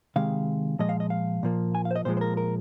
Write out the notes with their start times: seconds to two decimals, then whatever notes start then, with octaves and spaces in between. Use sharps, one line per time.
0.16 C3 D#3 G#3 F5
0.79 A#2 F3 G#3 D#5
0.89 F5
1.00 D#5
1.10 F5
1.43 A#2 F3 A#3
1.75 G#5
1.85 F5
1.91 C5
1.96 D#5
2.05 A#2 F3 G#3 C5
2.17 C5
2.21 A#4
2.37 A#4